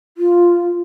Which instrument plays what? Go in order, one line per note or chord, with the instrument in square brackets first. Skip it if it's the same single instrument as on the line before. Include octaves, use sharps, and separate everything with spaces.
[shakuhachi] F4